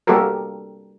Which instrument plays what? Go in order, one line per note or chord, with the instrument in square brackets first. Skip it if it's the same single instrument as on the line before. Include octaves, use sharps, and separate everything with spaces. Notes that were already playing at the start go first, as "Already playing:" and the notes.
[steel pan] G3 A#3 F#4 G4 A4 A#4